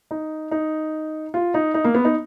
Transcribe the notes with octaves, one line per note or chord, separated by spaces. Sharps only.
D#4
D#4
F4
D#4
D#4
A#3
B3
D#4